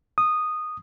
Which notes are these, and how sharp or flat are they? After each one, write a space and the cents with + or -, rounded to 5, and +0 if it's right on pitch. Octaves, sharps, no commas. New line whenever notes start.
D#6 -10